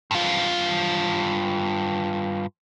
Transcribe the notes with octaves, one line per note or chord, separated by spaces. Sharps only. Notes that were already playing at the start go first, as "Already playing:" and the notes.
G2 F4